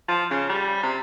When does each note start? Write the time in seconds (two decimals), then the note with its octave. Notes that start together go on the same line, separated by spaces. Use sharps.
0.08 F3
0.30 C#3
0.49 G3
0.83 C3